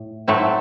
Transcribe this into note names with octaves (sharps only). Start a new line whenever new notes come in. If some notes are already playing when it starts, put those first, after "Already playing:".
Already playing: A2
A2 F#3 A3 C4 E4